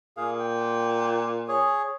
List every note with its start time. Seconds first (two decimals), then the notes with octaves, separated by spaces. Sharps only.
0.17 A#2 G#4 F5
0.39 G5
1.48 G#4 C#5